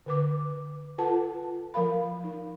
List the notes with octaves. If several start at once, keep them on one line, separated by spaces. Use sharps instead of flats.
D3 B4 D6
F4 A4 B4 F#5 A5
F3 A#4 F5 B5
D#4